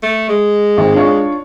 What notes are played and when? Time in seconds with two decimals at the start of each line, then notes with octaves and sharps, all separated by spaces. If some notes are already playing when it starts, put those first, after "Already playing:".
0.03 A3
0.29 G#3
0.77 G#1
0.94 D4 F4 C#5